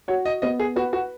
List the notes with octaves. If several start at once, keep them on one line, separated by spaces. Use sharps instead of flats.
F#4 C#5
D#5
B3 D#5
G#4
F#4 B4
F#4